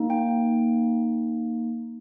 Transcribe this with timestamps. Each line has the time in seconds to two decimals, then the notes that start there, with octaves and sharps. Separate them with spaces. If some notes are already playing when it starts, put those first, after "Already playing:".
Already playing: A#3 D#4
0.10 G5